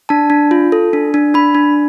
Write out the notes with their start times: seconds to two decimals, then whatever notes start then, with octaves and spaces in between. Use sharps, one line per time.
0.09 D4 A5
0.30 D4
0.51 F4
0.72 A4
0.93 D4
1.14 D4
1.34 D4 B5
1.55 D4